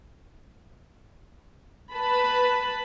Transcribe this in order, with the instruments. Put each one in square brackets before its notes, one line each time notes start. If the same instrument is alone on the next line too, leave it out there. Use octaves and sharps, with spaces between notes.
[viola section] B4 A5 B5